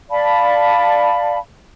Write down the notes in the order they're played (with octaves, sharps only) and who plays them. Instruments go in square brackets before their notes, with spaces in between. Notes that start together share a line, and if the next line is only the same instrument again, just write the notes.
[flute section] D5 F5 A5 B5